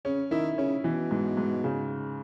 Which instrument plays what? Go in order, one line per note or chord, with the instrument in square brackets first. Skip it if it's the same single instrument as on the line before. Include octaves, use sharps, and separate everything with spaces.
[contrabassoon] C#3 [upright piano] C#4
[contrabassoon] D#3 [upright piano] E4
[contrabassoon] C#3 [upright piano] C#4
[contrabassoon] B2 [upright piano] E3
[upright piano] G#2
G#2
C#3